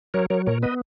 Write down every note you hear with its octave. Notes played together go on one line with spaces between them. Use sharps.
F#3 A#4 C#5
F#3 A#4 C#5
A#2 A#4 C#5
B3 B4 D#5